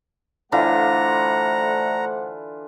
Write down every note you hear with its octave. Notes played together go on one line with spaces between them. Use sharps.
D3 E3 A3 F4 C5 F#5 A#5